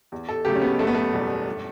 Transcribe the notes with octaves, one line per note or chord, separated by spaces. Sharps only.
E2
A4
C#3 F#3 A3 G4
C#4
B3
F#1 A3
B3
A3
E2 B2 G3
G1